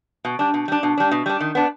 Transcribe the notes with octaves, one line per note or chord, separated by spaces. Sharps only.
B2
G3 D4
B2
G3 D4
B2
G3 D4
B2
G3 D4
D#3
B3 D4